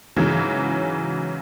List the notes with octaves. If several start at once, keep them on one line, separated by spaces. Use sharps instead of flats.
G#2 C#3 E3 F#3